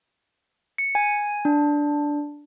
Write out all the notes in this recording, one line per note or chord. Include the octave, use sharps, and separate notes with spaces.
C#7
G#5
D4